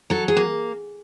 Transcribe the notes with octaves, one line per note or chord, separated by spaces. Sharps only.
F#3 A4
G#4
A#3